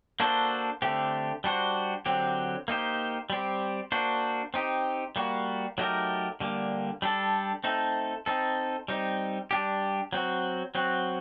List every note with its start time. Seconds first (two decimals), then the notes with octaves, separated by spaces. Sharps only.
0.20 A#3 D4 F#4 A4 C5
0.82 D3 A3 C4 G4
1.44 G3 D4 F#4 C5
2.06 D3 F#3 C4 G4
2.68 A#3 D#4 G4 C5
3.30 G3 C4 G4
3.92 A#3 D4 F#4 C5
4.54 C4 D#4 G4
5.16 G3 A#3 F#4
5.78 F#3 A3 D#4 G4 A#4
6.40 D3 G3 A#3
7.02 G3 D4 A4
7.64 A3 C4 D#4 A4
8.26 C4 D#4 A4
8.88 G3 C4 D#4
9.51 G3 D4 G4
10.13 F#3 C4 F#4
10.75 F#3 C4 F#4